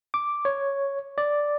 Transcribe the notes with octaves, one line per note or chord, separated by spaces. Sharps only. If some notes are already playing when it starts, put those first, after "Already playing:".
D6
C#5
D5